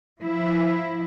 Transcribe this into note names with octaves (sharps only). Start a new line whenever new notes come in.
F3 E4